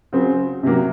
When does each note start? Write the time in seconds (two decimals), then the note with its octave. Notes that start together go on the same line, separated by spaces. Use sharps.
0.13 C#3 F#3 C4
0.63 C3 F#3 A#3